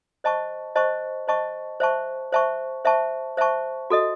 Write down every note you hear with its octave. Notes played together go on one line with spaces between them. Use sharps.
C5 D#5 A5 C#6
C5 D#5 A5 C#6
C5 D#5 A5 C#6
C5 E5 A5 C#6
C5 E5 A5 C#6
C5 E5 A5 C#6
C5 E5 A5 C#6
F#4 A4 D#5